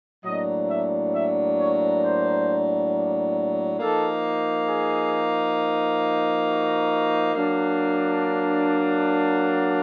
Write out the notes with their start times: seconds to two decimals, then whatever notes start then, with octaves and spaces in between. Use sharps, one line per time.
0.24 A2 F#3 A#3 D4 D#5
0.69 E5
1.13 E5
1.57 C#5
2.02 C5
3.79 F3 A#3 D#4 A4
4.68 G#4
6.46 F#4
7.35 F#3 A#3 D4